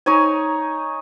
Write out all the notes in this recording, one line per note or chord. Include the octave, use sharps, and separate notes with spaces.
D#4 C#5 G#5